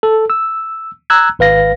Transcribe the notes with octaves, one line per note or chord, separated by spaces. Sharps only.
A4
E6
A#5 E6 F#6 G#6
G#1 B4 F5 A#6